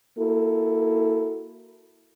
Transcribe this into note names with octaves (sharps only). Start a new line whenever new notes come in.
A#3 E4 F#4 A4